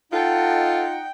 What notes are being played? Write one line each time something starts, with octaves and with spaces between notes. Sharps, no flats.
D#4 F4 A4 D#5 F#5 G5